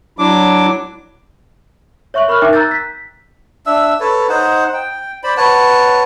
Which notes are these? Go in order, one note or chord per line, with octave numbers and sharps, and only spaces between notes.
F#3 D4 E4 D6
C#5 E5 C#6 F#6 F#7
A#4 B5 C#6 F6 F#6
D#4 A#4 E5 G5 D6
A#5 E6 F#6 G6 A6
B6
D4 E5 E6
A4 B4 C#5
D#4 C5 F#5
G5
C5 D5 B5
B4 C#5 F#5 A5